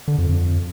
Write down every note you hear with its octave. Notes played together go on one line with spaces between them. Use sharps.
D3
F2
F2